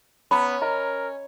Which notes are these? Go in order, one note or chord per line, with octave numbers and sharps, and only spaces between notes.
B3 C#4 A#5 B5
A#4 D#5 A#5